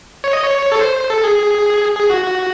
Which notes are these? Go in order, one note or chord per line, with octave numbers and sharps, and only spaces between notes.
C#5
D#5
C#5
A4
C5
A4
G#4
G#4
F#4
F#4